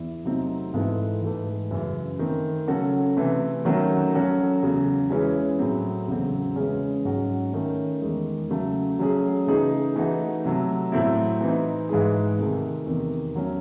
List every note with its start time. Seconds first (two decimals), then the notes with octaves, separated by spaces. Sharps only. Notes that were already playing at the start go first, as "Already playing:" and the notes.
Already playing: E2 E4
0.25 C3 F#3 A3 C4 D#4
0.74 G#2 E3 C4 E4 A4
1.22 G#2 E3 A3
1.71 F#2 C#3 E3
2.19 D#3 A3 C4
2.68 C#3 F#3 C#4 F#4 A4
3.17 C3 E3 A3
3.65 D#3 F#3 A3 C#4 F#4
4.13 F#3 C#4 F#4 A4
4.62 E2 C#3 F#3
5.10 E3 G#3 C#4 E4 G#4
5.59 A2 F#3 C4
6.08 E2 C#3 F#3 C4
6.56 C#3 E3 G#3 C#4 G#4
7.05 G#2 F#3 C#4 F#4
7.53 D#3 A3 C#4
8.02 E2 D#3 G#3
8.50 C#3 F#3 A3
8.99 F#3 A3 C#4 G#4
9.47 C#3 E3 A3 D#4 G#4
9.96 E3 A3 D#4 F#4
10.45 C3 F#3 A3
10.92 A2 F#3 A3 C4 E4
11.41 E3 C4 D#4
11.89 G#2 E3 G#3 D#4 G#4
12.39 C3 D#3 A3
12.86 E2 C3 D#3
13.35 F#3 A3 C#4